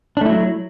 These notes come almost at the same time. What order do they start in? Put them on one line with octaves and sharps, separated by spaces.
D4 A3 E4 F#3